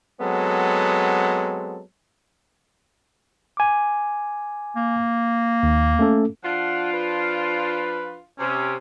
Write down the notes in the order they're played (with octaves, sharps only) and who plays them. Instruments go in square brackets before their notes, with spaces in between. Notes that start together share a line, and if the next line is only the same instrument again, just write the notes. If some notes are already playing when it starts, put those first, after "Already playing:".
[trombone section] F#3 G#3 B3 C4 A4
[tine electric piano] G#5 D6
[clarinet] A#3
[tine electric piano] D#2
A3 C#4 A4
[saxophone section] F3 D4 F4 [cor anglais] F#5
[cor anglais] B4
[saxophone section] C3 [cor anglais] C#4